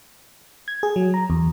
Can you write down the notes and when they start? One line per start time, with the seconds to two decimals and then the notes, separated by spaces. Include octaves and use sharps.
0.68 G#6
0.83 G#4
0.96 F#3
1.14 A#5
1.30 E2